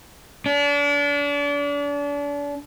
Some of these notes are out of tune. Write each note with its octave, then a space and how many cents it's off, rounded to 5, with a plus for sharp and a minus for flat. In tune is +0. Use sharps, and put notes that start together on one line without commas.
D4 -35